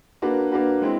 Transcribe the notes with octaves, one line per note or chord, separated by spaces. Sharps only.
A#3 D4 F#4 B4
A#3 D4 F#4 B4
G#3 C4 E4